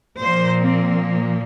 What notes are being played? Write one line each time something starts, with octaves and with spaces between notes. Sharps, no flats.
A#2 F3 A#3 C5
C4